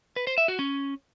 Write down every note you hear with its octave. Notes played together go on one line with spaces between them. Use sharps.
B4
C5
E5
F#4
C#4